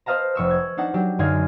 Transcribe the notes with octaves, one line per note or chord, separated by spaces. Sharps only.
B4 C5 D#5 F5 A5 A#5
F1 C#6 E6
F#6 G#6
D4 D#4 F#5 A5
F#3 D4 G4
F#2 D3 D#4 G#4 F5 G#6